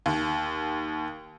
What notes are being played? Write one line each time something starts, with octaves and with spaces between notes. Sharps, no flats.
D#2